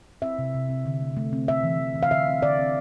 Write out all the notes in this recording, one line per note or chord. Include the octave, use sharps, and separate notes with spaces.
C4 E5
C3
C3
C4
D3
A3
A3
C4
A3 E5
E3
E3
E3
F5
D3 E5
C4
D3 D5
C4